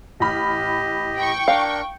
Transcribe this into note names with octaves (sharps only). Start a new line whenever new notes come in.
A1 G4 D#5 B5 F6
G5 C#6
D4 A#4 F5